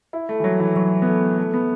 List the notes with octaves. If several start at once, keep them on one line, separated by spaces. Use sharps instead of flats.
E4
A3
E3
F#3
E3
F#3
B3
A3
A3
B3